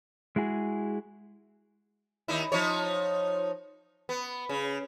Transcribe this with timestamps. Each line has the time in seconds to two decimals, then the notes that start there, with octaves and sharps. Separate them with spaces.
0.36 G#3 E4 F#4 G#4
2.28 D#2 D#4 E4
2.52 F3 D#4 C#5
4.09 B3
4.49 C#3